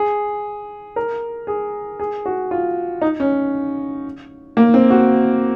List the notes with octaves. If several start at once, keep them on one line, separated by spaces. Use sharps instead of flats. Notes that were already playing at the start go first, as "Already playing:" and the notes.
Already playing: G#4
A#4
G#4
G#4
F#4
F4
D#4
C#4
A#3
C4
F#4